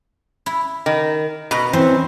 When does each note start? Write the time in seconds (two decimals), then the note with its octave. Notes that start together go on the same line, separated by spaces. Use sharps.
0.46 E4
0.86 D#3
1.51 B2 B4 A#5
1.73 E3 C4 C#4 C5